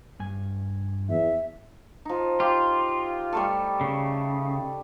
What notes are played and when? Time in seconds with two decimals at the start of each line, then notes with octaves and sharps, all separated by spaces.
0.20 G2 G#5
1.09 E2 E5
2.05 F3 D#4
2.40 F4 G4
3.33 G3 A3 A4
3.81 C#3